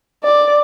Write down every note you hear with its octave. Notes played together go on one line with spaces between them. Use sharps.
D5